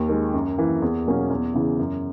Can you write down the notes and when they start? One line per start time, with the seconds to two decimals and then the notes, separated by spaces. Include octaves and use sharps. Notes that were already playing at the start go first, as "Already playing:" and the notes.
Already playing: D#2
0.09 D#3 G#3
0.33 F#2
0.58 E3 A#3
0.82 E2
1.07 B2 F#3 A#3 C#4
1.30 E2
1.54 C#3 E3
1.79 F#2